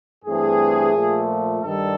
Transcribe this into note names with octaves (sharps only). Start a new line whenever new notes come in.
G2 E3 A3 C4 G#4
A#2 F3 A3
G2 D#3 G3 A4